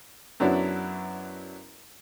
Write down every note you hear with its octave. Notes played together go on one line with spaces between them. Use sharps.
F#2 F#3 B3 D4 E4